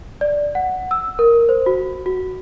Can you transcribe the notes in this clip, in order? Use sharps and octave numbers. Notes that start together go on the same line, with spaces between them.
D5
F#5
E6
A#4
C5
F#4
F#4